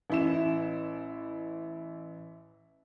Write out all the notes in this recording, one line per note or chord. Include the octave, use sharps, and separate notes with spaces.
A1 E4 E7